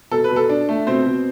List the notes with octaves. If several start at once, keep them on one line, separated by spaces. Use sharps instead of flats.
B2 A4
B4
B2
A4
D4
A3
B2 C4 C5
B2